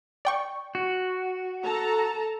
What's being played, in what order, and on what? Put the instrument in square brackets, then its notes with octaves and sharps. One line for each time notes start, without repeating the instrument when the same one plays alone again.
[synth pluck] D5 G5 C#6
[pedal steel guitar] F#4
[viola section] A4 A5 A#5